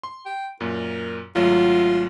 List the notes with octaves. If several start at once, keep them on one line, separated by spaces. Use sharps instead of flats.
C6
G5
F#2 A#2 A#4
G#1 F#3 A3 F4